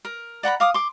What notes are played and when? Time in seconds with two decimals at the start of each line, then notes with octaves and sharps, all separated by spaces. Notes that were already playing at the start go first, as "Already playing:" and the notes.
0.05 A#4
0.43 D5 F#5 A#5 B5
0.60 F5 D6 D#6
0.74 C6 D6